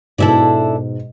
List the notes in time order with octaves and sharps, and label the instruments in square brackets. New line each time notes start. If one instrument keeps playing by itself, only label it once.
[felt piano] G#2 B2 [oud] D4 E4 A4